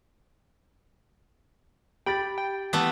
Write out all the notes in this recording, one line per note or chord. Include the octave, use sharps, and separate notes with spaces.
G4 G5 B5 A6
G5
E3 A3 B3